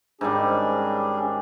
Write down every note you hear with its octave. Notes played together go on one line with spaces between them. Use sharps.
G#2 D#3 G3 C#4 D4 G#4